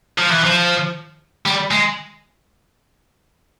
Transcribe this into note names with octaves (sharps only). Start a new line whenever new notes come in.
F3
E3
F3
G3
G#3